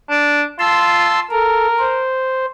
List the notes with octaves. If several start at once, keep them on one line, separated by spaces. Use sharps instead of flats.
D4
F4 A5 C6 E6
A4 A#4
C5